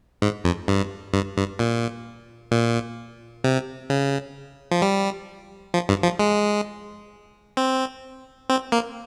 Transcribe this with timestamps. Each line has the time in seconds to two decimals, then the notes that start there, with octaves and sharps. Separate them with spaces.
0.22 G#2
0.44 F2
0.68 G2
1.14 G2
1.37 G2
1.59 A#2
2.51 A#2
3.44 C3
3.90 C#3
4.71 F3
4.82 G3
5.74 F3
5.89 G2
6.03 F3
6.19 G#3
7.57 C4
8.50 C4
8.72 A#3